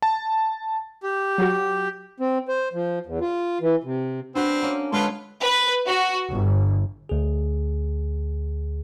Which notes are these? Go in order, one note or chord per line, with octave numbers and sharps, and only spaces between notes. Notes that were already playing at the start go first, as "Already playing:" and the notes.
A5
G4
F#3 F#4
C4
C5
F3
E2
F4
E3
C3
B3 C4 D4 F#4 B4
A#3 C#4
D3 G#3 C#4 F4 G#4 A4 B4
B4
F#4
G1
D2 G#4